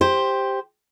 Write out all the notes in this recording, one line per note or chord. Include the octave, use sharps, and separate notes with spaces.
G4 C5